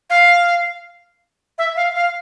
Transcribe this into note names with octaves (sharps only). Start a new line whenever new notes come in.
F5
E5
F5
F5